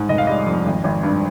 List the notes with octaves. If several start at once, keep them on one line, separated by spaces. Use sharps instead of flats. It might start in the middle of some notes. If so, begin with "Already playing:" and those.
Already playing: G#2
F1 D#5
F5
G3 D#5
F2
G#1
G#1
G2